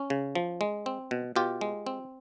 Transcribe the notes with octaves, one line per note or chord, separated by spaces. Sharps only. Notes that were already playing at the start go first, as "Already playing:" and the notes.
Already playing: C#4
C#3
F3
G#3
C4
B2
B2 F4 G4
G#3
C4